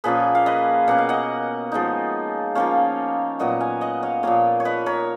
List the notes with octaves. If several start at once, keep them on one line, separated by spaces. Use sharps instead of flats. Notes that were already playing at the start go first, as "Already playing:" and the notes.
A#2 F3 A#3 C#4 G#4 B4
F5
B4 D#5
B2 A#3 C#4 F#5
F5
D#5 F#5
F3 G#3 D#4
F3 A#3 C#4 C#5 F5
A#2 F#3 B3 D#5 F#5
F5 G#5
D#5 F#5
C#5 F5
A#2 F3 A#3 C#5 F5
C#5
B4 D#5
A#4 C#5